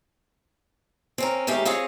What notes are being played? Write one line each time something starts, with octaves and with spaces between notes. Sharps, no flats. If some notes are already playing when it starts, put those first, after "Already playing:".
C4 C#4 A#4
D#2 G#3 A3 C#4 G4
C4 F4 G#4 C#5 D#5